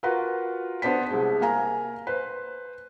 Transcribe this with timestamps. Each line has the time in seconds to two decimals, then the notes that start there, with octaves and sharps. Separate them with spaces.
0.03 F4 F#4 A#4 B4 F#5
0.82 B3 D4 C5 A5 B6
1.10 C2 G#3
1.41 A#3 F5 G#5 A#5
2.07 B4 C5